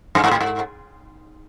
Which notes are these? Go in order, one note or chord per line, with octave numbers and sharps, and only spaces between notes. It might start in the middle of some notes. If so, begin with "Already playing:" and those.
G2
G#2
A2
G#2